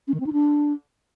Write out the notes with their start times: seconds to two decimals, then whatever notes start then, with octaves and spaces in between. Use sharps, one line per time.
0.08 C#4
0.14 D#3
0.20 C4
0.26 D#4
0.33 D4